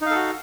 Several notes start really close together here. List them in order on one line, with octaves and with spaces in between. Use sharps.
D#4 F5 A4 F#4